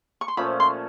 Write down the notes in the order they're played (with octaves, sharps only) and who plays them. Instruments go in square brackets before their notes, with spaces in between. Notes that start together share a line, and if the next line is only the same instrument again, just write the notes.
[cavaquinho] C#6
C6
[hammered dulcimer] A#2 F3 A3 C#4 [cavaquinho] B5
[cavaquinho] C6